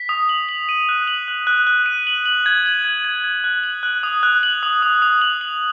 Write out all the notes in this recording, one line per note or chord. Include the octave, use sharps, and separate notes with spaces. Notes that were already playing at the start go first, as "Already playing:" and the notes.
Already playing: B6
D#6
F#7
F#7
D#7
F#6
F#7
F#6
F#6
F#6
D#7
F#7
F#7
G#6
F#7
G#6
G#6
G#6
F#6
F#7
F#6
D#6
F#6
F#7
D#6
D#6
D#6
F#7
F#7